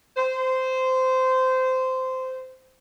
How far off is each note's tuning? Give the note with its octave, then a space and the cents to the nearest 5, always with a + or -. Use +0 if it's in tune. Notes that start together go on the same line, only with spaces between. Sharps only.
C5 -15